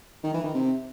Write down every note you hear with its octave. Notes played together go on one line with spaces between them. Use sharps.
D#3
E3
D#3
C3